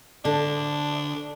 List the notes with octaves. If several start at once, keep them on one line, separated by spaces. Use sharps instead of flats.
D3 D4